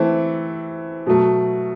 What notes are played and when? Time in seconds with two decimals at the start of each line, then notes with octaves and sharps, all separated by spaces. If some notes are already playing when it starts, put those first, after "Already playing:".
Already playing: E3 A3 C4
1.06 B2 F#3 A3